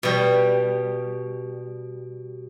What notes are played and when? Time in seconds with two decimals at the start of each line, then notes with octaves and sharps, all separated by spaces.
0.03 B2 G3